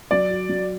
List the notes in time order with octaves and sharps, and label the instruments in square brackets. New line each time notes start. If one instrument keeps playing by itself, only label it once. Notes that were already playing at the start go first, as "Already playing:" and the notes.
[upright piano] F#3 [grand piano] D5
[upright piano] F#4
F#3